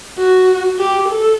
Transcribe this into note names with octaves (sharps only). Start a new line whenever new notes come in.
F#4
G4
A4